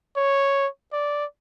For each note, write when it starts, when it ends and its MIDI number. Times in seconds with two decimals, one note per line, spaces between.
0.17 0.67 73
0.93 1.25 74